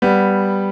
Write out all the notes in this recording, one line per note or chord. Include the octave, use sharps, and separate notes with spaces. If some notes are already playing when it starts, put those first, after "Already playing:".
G3 B3